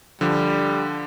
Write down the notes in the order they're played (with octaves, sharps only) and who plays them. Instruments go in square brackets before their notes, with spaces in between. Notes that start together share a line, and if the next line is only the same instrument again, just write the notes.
[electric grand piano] D3 F3 [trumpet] G3